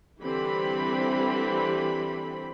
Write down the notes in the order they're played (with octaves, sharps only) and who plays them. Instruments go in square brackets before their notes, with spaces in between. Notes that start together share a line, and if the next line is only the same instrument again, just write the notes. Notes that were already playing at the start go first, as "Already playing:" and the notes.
[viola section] D3 E3 G3 C4 G4 B5